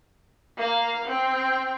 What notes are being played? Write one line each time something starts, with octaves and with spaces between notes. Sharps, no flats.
A#3 F5
C4 G5